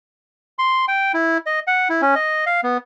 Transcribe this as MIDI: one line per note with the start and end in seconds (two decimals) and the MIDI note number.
0.58 0.85 84
0.88 1.12 79
1.14 1.38 64
1.46 1.60 75
1.67 1.88 78
1.90 2.02 64
2.02 2.15 61
2.15 2.45 75
2.46 2.61 77
2.64 2.77 59